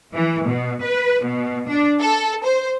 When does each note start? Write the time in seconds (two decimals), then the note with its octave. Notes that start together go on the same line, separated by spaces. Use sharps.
0.14 E3
0.46 B2
0.82 B4
1.24 B2
1.68 D4
2.00 A4
2.44 C5